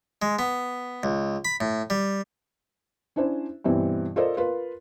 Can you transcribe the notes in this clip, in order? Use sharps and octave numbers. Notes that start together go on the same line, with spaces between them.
G#3
B3
C#2
B5
A2
G3
C#4 D4 E4 C5
G2 B2 E3 C4 E4
F4 A4 A#4 C5 D5 D#5
F4 A#4 B4